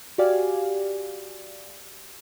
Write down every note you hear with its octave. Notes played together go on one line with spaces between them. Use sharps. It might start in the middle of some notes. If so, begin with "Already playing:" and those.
F#4 G4 D5 F5 G#5